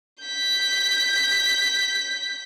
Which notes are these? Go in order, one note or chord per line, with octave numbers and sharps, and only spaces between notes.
G6 B6